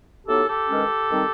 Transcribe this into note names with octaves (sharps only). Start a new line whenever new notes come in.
A2 F#3 B3 D#4 G4 A4
G4 A4
G2 D#3 G#3 C#4
D#3 G3 C4 D#4